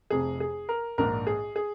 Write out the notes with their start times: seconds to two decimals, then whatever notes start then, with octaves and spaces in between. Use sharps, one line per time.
0.10 F1 F2 C3 G#4
0.40 G#4
0.69 A#4
0.98 A#1 G#2 D#3 A#3 D4 A#4
1.27 G#4
1.56 G#4